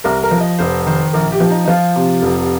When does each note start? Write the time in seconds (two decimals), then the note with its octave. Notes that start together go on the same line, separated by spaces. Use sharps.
0.04 C2 A#4
0.23 A#4
0.31 F3
0.40 D#5
0.59 F1 C5
0.86 D#3 C5
1.13 A#1 A#4
1.32 G4
1.40 F3
1.50 D#4
1.64 D#4
1.68 F3 F4
1.96 C3
2.22 F1